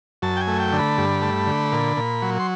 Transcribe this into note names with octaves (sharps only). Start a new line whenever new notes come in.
F#2 A5
G5
G#5
A3
G5
D3
B5
G2
A3
D3
A#2
A#2
F#3
C6